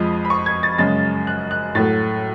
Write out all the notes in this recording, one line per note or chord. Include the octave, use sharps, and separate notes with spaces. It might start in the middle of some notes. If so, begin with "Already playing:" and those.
Already playing: F2 F3 G#3 B5
B5
C#6
G#6
A6
F#2 C#3 G#3 A6
F#6
F#6
A2 F#3 A3 A6